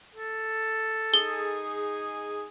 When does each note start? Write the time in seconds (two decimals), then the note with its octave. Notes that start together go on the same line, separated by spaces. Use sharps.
0.15 A4
1.14 D#4 G#4 G7